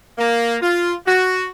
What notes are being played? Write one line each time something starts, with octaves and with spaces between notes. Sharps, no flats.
A#3
F4
F#4